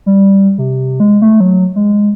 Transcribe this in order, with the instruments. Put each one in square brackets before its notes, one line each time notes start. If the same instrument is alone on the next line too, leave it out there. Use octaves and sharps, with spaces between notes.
[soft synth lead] G3
C3
G#3
A3
F#3
G#3